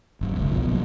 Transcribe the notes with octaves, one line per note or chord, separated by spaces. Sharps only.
G1 F#2
E1 C#2
B1 B2 F3
A1 A#2 C#3 F#3